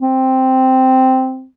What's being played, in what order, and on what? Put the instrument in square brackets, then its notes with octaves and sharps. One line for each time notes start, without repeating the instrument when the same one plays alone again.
[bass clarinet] C4